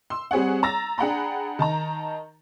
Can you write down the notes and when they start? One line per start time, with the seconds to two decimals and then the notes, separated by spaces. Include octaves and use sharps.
0.10 C6 E6
0.31 G3 C4 G#4 C#5 F#5
0.63 A#5 E6 A6 A#6
0.98 D4 G#4 F#5 G5 A#5 B5
1.59 D#3 A5 A#5